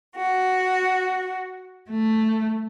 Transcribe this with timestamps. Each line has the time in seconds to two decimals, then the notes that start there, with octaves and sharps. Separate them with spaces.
0.15 F#4
1.90 A3